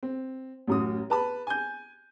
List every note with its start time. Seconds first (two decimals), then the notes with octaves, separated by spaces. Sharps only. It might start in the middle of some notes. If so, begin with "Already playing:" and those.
0.03 C4
0.67 A1 F#2 D#6
1.10 B4 A5 B5
1.47 G#5 G6